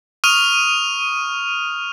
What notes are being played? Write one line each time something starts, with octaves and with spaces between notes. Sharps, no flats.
C#6 D#6 F6 D#7 F7